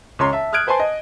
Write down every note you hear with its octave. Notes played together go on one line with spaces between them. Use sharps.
C#2 C#5 A#5 C6
E5 A5
D#6 F6 F#6 G#6 D7
B4 C5 G#5 A5 C6
D#5